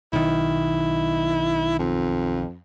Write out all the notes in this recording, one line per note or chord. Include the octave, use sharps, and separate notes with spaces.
B1 D#3 E4
F2